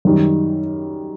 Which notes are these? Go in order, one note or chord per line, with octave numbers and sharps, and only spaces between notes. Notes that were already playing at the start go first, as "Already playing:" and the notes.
F#2 D#3 G3